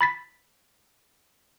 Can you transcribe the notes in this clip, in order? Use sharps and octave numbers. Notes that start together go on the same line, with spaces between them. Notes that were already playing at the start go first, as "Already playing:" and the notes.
B5 A6 B6